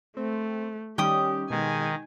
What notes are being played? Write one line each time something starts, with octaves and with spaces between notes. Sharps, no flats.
A3 C4
D#3 G3 C#4 G4 G5 D#6
B2 D#3 G#3 D#4 G#5